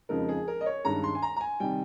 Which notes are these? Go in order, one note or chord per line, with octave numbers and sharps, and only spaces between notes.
F2 C#3 F3 G#3 D#4 A#4
G#4
A#4
D#5
C#5
G2 D#3 G#3 C#4 A#5
C6
G#5
A#5
A#5
G#5
C3 D#3 G3 G5